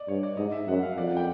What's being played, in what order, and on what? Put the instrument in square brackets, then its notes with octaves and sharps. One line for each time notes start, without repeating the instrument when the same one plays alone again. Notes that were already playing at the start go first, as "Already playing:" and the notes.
Already playing: [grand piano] D5 D#5
[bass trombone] G2 [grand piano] C#5
[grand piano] D5
[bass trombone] G#2 [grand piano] D#5
[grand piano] E5
[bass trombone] F#2 [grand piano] F#5
[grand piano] F5
[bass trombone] F2 [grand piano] D5
[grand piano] F#5
G5